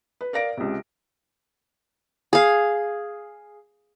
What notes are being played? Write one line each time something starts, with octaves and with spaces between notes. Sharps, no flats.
B4
A#4 D5 F5 A#6 D7
C#2 C3
G#4 F5